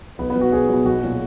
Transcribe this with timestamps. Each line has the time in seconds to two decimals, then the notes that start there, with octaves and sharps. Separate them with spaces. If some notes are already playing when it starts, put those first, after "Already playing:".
0.19 B1 B3
0.30 B3
0.35 B2 F#3
0.41 F#4
0.52 B1 G#4
0.69 B2 F#3
0.85 B1 F#4
1.02 A#2 F#3